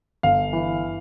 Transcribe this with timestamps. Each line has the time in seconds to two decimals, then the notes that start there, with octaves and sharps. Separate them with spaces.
0.23 G1 F5
0.53 E3